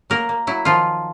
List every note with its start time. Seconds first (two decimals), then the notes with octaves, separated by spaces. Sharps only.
0.10 F#3 A#3 A#4
0.29 A#3
0.47 F#3 E4
0.65 D#3 F3 F4